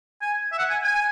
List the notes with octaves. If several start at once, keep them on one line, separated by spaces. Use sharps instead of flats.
G#5
E5
F#5
G#5
G#5